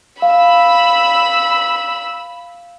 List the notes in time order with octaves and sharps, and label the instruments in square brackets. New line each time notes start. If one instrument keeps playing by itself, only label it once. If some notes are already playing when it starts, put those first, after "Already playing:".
[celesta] F5 [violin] B5 E6